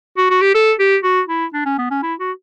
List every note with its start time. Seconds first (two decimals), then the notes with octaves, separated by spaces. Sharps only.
0.17 F#4
0.30 F#4
0.42 G4
0.55 A4
0.79 G4
1.03 F#4
1.28 E4
1.53 D4
1.66 C#4
1.78 B3
1.90 C#4
2.03 E4
2.20 F#4